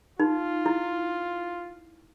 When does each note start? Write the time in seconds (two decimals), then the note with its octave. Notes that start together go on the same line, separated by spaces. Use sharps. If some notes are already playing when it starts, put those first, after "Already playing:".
0.20 D#4 F4
0.66 E4